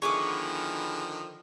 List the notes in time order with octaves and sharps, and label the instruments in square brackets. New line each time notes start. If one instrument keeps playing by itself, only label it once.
[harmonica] D3 D#3 F3 [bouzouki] G#3 B3 E4 [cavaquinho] C#6 D6